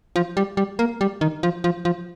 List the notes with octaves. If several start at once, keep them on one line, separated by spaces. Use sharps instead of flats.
F3
G3
G3
A#3
G3
D#3
F3
F3
F3